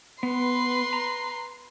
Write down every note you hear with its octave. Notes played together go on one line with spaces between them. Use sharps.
B3 B4 C6
A#5